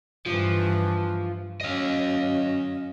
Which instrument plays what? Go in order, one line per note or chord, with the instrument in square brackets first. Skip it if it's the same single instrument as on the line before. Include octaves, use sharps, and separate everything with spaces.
[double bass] G2 E3 [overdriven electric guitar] F3
[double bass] F#2 C#4 [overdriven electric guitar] D#5 F5